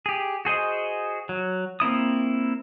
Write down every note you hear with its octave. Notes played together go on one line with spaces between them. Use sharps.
G4 G#4
F#4 G#4 C5 D#5
F#3
A#3 C4 E4 D#6